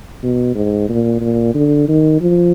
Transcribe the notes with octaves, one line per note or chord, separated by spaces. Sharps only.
B2
G#2
A#2
A#2
D3
D#3
F3